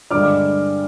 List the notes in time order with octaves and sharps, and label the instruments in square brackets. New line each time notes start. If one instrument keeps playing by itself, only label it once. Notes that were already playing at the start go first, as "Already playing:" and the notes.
[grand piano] G2 D3 G#3 D4 D6 F6